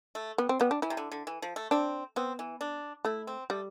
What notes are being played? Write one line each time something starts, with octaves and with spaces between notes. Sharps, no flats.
A3
G3 B3
C4
G3 B3
D4
E3 E4
C3
D3
D3
E3
F3
A3
C4 D4
B3 C4
E3
D4
A3 E4
C4
G3 A3